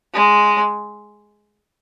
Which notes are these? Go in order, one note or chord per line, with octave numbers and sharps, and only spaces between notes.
G#3